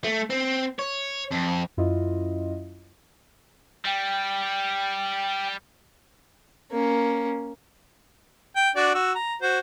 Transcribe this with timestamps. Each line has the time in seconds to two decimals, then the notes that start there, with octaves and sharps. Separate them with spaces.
0.04 A3
0.30 C4
0.79 C#5
1.32 F2
1.77 F#2 E4 F4 D#5
3.85 G3 G5
6.71 A#3 C#4
8.56 G5
8.76 D4 F#4 D5
8.94 F#4 E6
9.15 A#5
9.41 F#4 C5